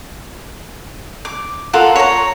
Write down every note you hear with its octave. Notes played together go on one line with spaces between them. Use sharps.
D6
F4 A4 A#4 F#5
C#5 A#5